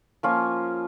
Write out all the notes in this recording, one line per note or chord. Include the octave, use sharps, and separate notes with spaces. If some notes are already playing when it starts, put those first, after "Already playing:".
F3 A#3 C#4 F4